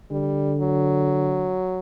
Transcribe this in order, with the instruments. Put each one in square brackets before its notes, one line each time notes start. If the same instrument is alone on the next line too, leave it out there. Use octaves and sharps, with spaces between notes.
[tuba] D3 [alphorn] G3
[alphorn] F#3